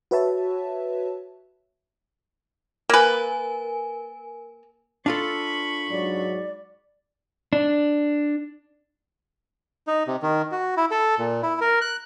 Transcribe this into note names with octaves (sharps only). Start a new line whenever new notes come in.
F#4 B4 C#5 E5 A5
A#3 A#4 B4 G#5
D4 F4 A4 B5 C#6
G#2 F#3 D5
D4
D#4
C3
D#3
F#4
E4
A4
A#2
E4
A#4
F#6